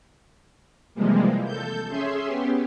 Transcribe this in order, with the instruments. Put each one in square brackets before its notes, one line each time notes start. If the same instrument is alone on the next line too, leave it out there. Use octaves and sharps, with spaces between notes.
[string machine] C3 E3 F3 G3 G#3 A#3
A4 G6
C#4 G#4 E5 C6
B3 C#4 G4